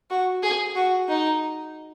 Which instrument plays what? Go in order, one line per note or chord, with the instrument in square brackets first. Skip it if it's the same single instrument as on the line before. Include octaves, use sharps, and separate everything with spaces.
[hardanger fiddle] F#4
G#4
F#4
D#4